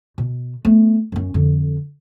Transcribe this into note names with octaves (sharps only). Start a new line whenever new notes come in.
B2
A3 B3
F#2 C#4
F2 D3